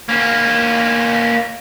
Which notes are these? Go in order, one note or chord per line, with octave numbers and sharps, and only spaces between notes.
A#3 C#4